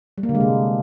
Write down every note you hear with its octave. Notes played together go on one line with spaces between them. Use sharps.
G3
A#3
D3
G#3
C3